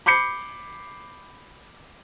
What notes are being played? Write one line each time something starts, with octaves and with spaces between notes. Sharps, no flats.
B5 D6 G6 C7 C#7